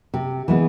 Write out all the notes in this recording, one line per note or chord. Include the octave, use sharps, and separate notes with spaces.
C3
E3 G#3 B3